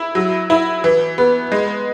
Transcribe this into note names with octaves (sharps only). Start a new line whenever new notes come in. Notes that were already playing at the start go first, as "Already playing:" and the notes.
Already playing: E4
F#3
E4
E3
B3
G#3